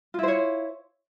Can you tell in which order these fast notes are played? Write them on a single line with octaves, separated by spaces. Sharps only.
F4 E4 C5 C#5